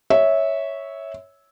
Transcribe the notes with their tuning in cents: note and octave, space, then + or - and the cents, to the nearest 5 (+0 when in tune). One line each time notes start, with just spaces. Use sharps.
C#5 +0 E5 -15